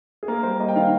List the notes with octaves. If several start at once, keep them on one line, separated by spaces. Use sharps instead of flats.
G#4
A#3 A#4
G3 C5
A#3 D#5
G5
D#3 F5